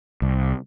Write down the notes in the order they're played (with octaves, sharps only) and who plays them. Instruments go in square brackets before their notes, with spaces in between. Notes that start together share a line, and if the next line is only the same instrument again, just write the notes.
[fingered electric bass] C2